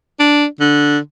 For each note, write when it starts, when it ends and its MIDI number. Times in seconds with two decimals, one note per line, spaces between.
0.20 0.45 62
0.60 0.98 50